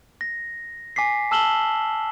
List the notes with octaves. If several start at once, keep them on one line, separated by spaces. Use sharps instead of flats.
A#6
G#5 D6 B6 C7
A5 E6 F6 E7 F#7 G7